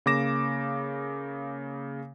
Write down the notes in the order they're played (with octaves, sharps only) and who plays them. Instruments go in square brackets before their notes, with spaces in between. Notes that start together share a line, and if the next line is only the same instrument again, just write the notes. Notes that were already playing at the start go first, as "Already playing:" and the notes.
[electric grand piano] C#3 A#3 D6 A#6 E7